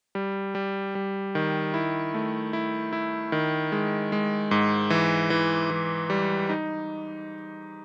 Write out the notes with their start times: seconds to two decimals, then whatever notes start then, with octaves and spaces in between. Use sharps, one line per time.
0.15 G3
0.55 G3
0.95 G3
1.35 D#3
1.74 E4
2.14 A3
2.53 E4
2.93 E4
3.32 D#3
3.72 G#3
4.12 G#3
4.51 G#2
4.90 E3
5.30 E3
5.70 E3
6.10 G3
6.49 D#4